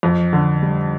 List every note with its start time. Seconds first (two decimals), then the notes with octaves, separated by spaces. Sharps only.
0.03 F2
0.33 D3
0.62 G3